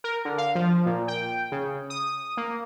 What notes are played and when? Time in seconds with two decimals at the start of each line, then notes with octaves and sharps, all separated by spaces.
0.04 A#4
0.25 D3
0.38 F5
0.55 F3
0.86 A#2
1.08 G5
1.52 C#3
1.90 D#6
2.06 D#6
2.37 A#3